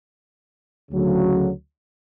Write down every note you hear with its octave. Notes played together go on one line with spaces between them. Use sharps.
D2 C#3 F#3 C#4